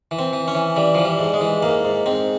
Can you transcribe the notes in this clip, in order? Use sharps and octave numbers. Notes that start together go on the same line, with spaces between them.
E3
C4
E3
C#4
E3
E3 G3
E3 F3
G3
G#2
G#3
E3
G#2 A#3
G#2
G#2 C4